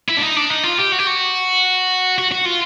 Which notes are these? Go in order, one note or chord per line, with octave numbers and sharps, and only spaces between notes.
E4
D4
D#4
D4
D#4
F4
G4
F#4
G4
F#4
F#4
F#4
F4